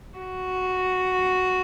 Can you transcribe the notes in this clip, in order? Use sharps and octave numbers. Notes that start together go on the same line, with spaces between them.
F#4